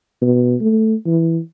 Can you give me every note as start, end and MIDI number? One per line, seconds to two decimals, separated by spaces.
0.22 0.55 47
0.61 0.95 57
1.06 1.39 52